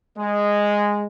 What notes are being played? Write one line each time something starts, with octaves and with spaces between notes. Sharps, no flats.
G#3